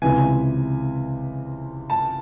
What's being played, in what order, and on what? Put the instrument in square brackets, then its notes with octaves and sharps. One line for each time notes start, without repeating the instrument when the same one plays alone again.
[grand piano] C#2 C3 E3 [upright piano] G#5
[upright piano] A5